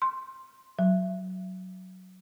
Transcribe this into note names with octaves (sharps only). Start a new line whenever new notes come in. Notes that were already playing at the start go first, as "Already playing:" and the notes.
C6
F#3